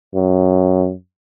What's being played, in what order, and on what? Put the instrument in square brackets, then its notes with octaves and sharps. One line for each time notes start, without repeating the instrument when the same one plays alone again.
[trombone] F#2